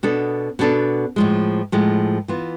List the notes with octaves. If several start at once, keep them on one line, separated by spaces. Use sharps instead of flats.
B2 B3 D4 A4
B2 B3 D4 A4
A2 F3 G#3
A2 F3 G#3
E3 B3 F4